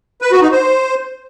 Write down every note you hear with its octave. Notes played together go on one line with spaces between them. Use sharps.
B4
F#4
D#4
C5